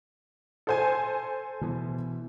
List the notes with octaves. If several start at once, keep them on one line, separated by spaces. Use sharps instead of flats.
A4 C5 G#5
B2 E3